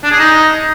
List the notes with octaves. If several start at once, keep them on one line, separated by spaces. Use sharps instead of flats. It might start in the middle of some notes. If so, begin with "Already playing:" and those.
D4
G#4
D#4